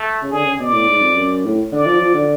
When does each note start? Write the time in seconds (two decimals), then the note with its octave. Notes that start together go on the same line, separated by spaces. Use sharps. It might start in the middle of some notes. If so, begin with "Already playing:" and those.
Already playing: A3
0.22 C#3
0.31 D3 G#4
0.45 C#3
0.60 B2 D5
0.73 A2
0.87 G#2
1.01 F2
1.16 F#2
1.45 A2
1.72 D3 D5
1.87 F3
2.01 F3
2.14 D3